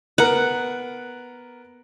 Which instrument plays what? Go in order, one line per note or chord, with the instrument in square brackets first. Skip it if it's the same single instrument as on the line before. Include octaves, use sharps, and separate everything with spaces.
[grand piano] B3 A#4 [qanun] F#5